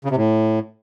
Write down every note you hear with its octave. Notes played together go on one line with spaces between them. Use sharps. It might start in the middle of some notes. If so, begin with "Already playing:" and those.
C#3
C3
A2